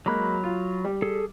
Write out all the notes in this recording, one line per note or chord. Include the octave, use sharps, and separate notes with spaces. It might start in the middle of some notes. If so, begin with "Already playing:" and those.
F#3 G#3 A#3 B5 F#6
F4
G3
G#4 A4